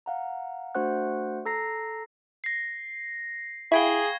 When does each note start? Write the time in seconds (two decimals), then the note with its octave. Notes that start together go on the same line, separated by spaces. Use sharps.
0.06 F5 F#5 A#5
0.75 A3 D4 F#4 C5 F#5 F#6
1.46 A4 A#5 A#6 C7
2.44 A#6 C7
3.72 E4 G#4 F5 G5 B5 C#6 G#6 G7